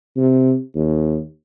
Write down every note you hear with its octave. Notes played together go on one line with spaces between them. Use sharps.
C3
D#2